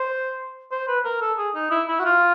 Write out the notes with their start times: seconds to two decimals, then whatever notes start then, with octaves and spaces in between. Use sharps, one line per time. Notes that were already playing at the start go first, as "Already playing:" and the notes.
Already playing: C5
0.72 C5
0.88 B4
1.05 A#4
1.21 A4
1.38 G#4
1.55 D#4
1.71 E4
1.88 E4
1.99 F#4
2.05 F4